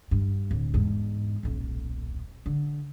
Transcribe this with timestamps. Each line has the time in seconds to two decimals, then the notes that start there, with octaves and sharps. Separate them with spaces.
0.11 G2
0.51 D1
0.74 E2 G#2
1.43 D#1 B1
2.46 D3